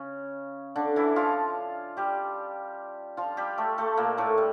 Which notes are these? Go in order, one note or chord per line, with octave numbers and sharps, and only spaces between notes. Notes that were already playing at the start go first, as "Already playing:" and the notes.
Already playing: C#3 C#4
D3 D4
E3 E4
F3 F4
G3 G4
F3 F4
G3 G4
A3 A4
A3 A4
A#2 A#3
A2 A3
G3